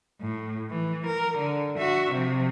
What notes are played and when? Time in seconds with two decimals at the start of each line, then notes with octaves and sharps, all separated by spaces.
0.21 A2
0.70 E3
1.06 A#4
1.37 D3
1.78 F#4 E5
2.12 C3 F3